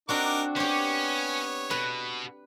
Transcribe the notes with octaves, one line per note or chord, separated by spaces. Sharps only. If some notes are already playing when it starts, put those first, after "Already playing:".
C4 D4 D#4 F#4 A#4 D6
B3 C#4 G4 C5 C#5
B2 B4